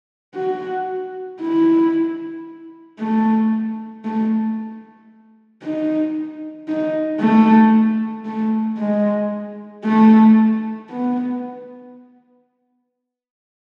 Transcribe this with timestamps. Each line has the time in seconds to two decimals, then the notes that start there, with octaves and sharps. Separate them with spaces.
0.35 F#4
1.41 E4
2.99 A3
4.05 A3
5.62 D#4
6.68 D#4
7.20 A3
8.25 A3
8.78 G#3
9.84 A3
10.90 B3